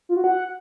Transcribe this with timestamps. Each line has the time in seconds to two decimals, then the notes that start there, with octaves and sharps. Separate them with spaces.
0.09 F4
0.16 F#4
0.24 F#5